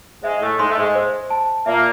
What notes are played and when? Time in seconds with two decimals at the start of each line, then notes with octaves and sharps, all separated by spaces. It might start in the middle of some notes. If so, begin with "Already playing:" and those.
0.23 G#2 G#3 E5
0.41 A2 A3
0.59 G#2 G#3 C6
0.70 A3
0.77 G#2 G#3
0.95 C5
1.30 A5
1.66 A#2 A#3 E5